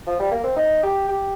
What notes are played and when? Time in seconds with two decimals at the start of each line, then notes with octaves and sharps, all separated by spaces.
0.07 F3
0.19 G3
0.32 A#3
0.44 C4
0.56 D#4
0.83 G4
1.09 G4